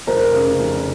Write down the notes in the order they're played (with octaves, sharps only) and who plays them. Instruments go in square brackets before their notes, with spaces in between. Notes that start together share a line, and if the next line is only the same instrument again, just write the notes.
[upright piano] F1 [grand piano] A#4 C5
[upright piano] C#3
F1